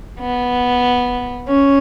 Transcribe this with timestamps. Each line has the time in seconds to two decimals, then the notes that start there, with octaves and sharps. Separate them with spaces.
0.20 B3
1.48 C#4